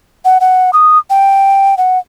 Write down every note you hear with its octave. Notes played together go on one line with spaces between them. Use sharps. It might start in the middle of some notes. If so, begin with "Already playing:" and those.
F#5
F#5
D#6
G5
F#5